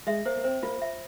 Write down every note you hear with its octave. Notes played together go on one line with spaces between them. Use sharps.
G#3 E5
A#3 C5
A#3
C4 C5
A#3 F4
E5